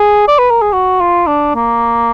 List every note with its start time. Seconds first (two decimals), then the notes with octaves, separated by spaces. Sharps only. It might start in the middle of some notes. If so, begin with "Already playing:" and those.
Already playing: G#4
0.28 D5
0.38 B4
0.50 A#4
0.62 G#4
0.73 F#4
1.00 F4
1.27 D4
1.55 A#3